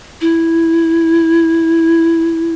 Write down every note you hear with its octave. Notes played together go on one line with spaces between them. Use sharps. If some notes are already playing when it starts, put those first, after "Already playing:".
E4